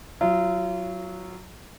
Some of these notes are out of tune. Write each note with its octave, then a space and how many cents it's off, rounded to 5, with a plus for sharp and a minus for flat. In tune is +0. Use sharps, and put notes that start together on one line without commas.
F#3 +0 F4 -35